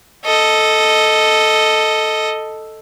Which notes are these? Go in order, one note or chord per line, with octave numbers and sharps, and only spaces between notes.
A4 D#5